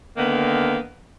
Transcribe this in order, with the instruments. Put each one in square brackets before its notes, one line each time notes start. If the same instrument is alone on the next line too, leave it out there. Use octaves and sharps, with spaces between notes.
[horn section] D3 D#3 A#3 B3